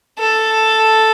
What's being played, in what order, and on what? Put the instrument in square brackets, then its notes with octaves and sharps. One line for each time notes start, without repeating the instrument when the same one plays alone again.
[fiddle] A4